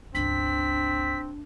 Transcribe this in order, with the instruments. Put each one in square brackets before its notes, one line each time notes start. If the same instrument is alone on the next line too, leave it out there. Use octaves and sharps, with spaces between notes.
[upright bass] G1 C#2 [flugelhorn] C4 [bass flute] D4 [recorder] B6